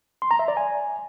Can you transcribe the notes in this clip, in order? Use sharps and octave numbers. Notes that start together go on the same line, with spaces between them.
C6
A#5
E5
D5
G#5